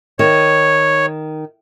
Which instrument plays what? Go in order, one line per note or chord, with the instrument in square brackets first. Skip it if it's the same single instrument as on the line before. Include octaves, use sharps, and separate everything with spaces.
[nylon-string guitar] D#3 [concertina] C#5